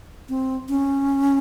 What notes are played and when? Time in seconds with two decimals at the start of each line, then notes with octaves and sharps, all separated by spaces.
0.29 C4
0.69 C#4